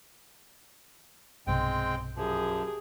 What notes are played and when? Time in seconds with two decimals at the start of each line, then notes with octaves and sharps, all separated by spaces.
1.47 B1 G2 C3 G#3 C4 G5
2.16 F#2 F3 G4 G#4